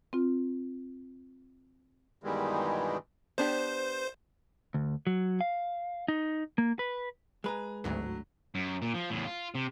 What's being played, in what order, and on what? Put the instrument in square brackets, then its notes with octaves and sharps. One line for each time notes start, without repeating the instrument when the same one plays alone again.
[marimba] C4 F4
[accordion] G2 B2 D#3 E3 G3 G#3
[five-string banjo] B3 D4 G4 [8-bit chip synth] C5
[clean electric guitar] D2
F#3
F5
D#4
A#3
B4
[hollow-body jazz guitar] G#3 B4 [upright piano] G#5 A#5
[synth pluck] G#1 D2 [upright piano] A2 F#3
[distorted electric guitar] F#2
A#2
F3
E2 A2
F4
C3